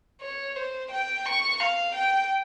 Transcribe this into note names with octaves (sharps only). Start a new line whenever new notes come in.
C#5
C5
G5
C#6
F5
G5